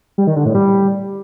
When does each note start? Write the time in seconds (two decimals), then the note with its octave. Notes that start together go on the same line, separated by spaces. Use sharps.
0.18 G3
0.27 D#3
0.36 D3
0.46 A2
0.55 G3